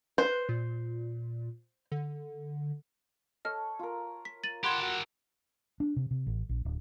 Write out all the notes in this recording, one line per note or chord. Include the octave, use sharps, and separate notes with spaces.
B4 C5
A#2
D3
A4 C#5 D#5 F6
F4 A#4
B6
A6 D#7 F#7
G4 A4 F#5 B5 C6 G#6
F#4
D4
C3
C3
A1
A#1
D1